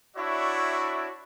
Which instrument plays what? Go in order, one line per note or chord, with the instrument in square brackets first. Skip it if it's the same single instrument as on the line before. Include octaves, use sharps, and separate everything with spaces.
[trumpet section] D4 E4 F#4 C#5 D5 E5